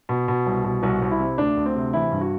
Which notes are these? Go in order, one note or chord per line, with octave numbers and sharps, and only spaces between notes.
B2
B2
C2
B2
C2 F#4
C2
E4
C3
D2 D4
D2
C4
C3
E3 E4
G2
F#4